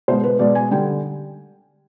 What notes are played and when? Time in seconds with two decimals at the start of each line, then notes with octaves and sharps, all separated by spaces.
0.08 B2 G#3 C5
0.24 B4
0.39 B2 G#3 D5
0.55 G#5
0.71 D3 G3 G5